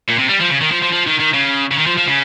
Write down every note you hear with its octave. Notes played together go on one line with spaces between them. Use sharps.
A#2
C3
G3
F3
C#3
D#3
F3
F3
F3
D#3
D#3
C#3
C#3
D#3
F3
F3
C#3